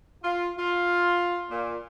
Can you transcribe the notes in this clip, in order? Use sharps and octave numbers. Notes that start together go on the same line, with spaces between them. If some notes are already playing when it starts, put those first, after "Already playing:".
F4
F4
A#2